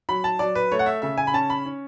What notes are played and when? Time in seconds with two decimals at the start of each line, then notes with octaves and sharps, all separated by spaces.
0.09 F#3 B5
0.24 A5
0.39 F#3 D5
0.55 B4
0.72 A3 C#5
0.79 F#5
0.86 E5
1.02 C#3 E5
1.18 G#5
1.27 B5
1.33 C#4 A5
1.50 B5
1.66 C#4